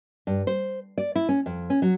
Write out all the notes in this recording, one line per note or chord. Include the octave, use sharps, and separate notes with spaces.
G2
C5
D5
E4
C#4
F2
C#4
F#3